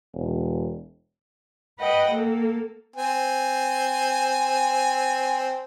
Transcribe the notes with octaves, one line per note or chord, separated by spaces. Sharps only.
E1
B4 D#5 F#5 G5
A#3 A4
C4 G#5